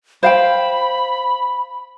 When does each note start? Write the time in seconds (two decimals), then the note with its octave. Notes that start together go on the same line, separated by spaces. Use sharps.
0.23 C5 F5 G5 B5